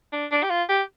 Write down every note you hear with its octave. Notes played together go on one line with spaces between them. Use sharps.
D4
D4
G4
F4
G4